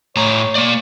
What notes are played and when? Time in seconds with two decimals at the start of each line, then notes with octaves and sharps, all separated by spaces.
0.16 A2 C#5 A#5
0.55 A#3 D5